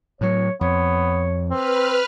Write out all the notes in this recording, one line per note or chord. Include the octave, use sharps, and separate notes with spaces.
A2 F#3 C#5
F2 B3 C#5
C4 B4 F6